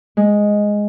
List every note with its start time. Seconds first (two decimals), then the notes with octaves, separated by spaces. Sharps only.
0.17 G#3